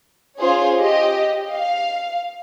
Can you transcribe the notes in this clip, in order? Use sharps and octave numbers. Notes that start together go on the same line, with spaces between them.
C#4 F4 G#4 C5 C#5
G4 D#5
F5